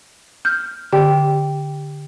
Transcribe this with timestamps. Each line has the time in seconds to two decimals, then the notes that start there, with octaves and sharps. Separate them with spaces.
0.45 F6 G6
0.93 D3 G4 G5